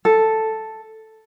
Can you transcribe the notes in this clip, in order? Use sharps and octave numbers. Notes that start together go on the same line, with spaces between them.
A4